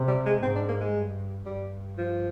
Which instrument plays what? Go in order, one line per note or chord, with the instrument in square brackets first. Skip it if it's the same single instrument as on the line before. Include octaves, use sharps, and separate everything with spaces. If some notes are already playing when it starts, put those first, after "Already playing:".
Already playing: [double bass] C3
[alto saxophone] G3
G#3
[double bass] G#2 [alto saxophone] C4
[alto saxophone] D4
A#3
G#3
[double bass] G2
[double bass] G2 [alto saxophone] G3
[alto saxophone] F3